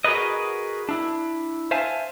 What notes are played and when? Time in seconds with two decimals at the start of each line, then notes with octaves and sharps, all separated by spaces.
0.05 F#4 G#4 A#4 B4 D#5
0.89 D4 E4
1.71 C5 E5 F5 G#5 A5